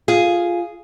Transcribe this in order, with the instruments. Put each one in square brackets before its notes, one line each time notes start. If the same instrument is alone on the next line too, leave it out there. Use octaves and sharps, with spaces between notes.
[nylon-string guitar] F4 G#4